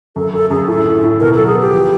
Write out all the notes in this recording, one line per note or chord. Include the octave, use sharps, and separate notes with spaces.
F#2 A4
F#2 A4
F#2 G#4
A2 A4
A2
A2
B2 A#4
F#3 A4
G#4
B3
G4
F3